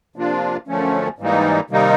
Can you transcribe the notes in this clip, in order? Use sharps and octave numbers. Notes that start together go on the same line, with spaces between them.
C3 F3 A#3 D4 F4
F#2 D3 F3 A3 C#4
G#2 E3 G3 A#3 D#4
C3 D#3 G3 A#3 D#4